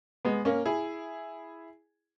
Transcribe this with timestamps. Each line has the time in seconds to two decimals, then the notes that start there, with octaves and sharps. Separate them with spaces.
0.25 G#3 B3
0.45 A#3 C#4
0.66 E4 G#4